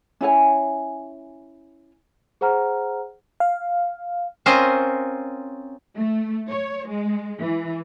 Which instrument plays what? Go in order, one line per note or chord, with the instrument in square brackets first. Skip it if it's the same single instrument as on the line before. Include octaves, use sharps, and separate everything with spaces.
[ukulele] C#4 E4 C#5 G#5
[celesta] G#4 C5 F#5 A#5 F6
[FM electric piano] F5
[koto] C4 C#4 F4 A#4 C5 D#5
[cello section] A3
C#5
G#3
E3